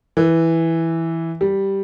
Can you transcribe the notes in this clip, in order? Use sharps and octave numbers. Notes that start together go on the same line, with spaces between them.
E3
G3